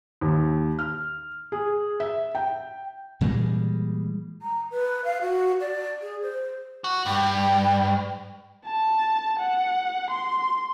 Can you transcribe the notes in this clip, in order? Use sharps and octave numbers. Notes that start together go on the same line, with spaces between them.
D#2
F6
G#4
E5
G5
A#2 E3 G3 G#3
A#5
B4
F5
F#4
D5
G#4
C5
F#4
G2 G5
A5
F#5
C6